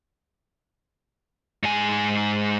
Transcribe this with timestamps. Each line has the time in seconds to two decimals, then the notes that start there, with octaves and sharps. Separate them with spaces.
1.63 G#2 G#5